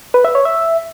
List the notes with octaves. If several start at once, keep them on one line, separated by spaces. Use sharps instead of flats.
B4
E5
C#5
E5